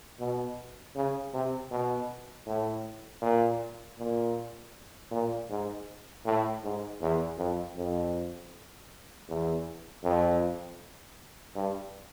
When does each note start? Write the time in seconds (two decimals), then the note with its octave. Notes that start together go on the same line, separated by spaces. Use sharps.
0.19 B2
0.96 C#3
1.34 C3
1.71 B2
2.47 A2
3.22 A#2
3.98 A#2
5.11 A#2
5.50 G#2
6.25 A2
6.63 G#2
7.01 E2
7.38 F2
7.76 F2
9.28 E2
10.04 F2
11.55 G2